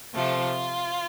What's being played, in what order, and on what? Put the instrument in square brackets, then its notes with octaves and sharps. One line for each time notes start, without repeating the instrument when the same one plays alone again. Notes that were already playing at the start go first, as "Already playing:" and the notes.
[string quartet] C3 F3 A3 F4